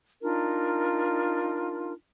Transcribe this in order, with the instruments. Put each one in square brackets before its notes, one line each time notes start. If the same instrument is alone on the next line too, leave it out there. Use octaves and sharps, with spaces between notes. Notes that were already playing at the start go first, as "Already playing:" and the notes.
[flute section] D4 D#4 F4 A#4